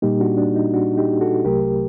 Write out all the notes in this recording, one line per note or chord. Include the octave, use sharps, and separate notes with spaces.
A#2 G3 A#3 D#4 G4
D4 F#4
D4
D#4
D4 F#4
D#4 G4
F#4 A4
C2 C3 F#3 A3 G4 A#4